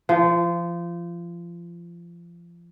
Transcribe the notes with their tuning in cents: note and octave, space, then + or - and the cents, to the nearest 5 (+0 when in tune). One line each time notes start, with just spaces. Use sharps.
F3 -25